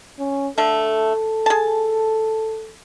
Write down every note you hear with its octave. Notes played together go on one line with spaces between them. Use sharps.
C#4
D3 A3 A4
G#4 A5